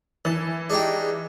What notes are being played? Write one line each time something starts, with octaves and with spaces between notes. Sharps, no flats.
E3 A5
D4 D#4 G4 G#4